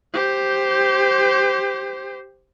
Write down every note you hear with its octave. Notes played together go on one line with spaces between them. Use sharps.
G4 C5